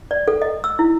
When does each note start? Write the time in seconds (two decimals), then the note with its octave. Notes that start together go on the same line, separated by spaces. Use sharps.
0.11 D5
0.28 A4
0.42 D#5
0.64 E6
0.79 E4